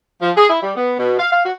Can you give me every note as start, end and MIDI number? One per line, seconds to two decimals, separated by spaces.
0.22 0.32 53
0.37 0.46 68
0.49 0.60 64
0.63 0.75 55
0.76 0.94 59
0.99 1.16 47
1.19 1.31 77
1.32 1.42 77
1.45 1.52 66